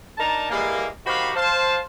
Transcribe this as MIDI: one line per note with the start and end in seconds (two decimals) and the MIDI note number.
0.18 0.47 62
0.18 0.47 63
0.18 0.47 70
0.18 0.47 81
0.49 0.87 52
0.49 0.87 55
0.49 0.87 56
0.49 0.87 58
1.06 1.31 51
1.06 1.31 66
1.06 1.31 67
1.06 1.31 72
1.06 1.31 77
1.06 1.31 83
1.35 1.78 72
1.35 1.78 77
1.35 1.78 81